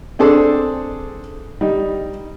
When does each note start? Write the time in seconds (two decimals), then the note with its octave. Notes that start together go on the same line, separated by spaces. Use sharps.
0.19 C4 D4 G#4 A4 C5
1.61 G3 D#4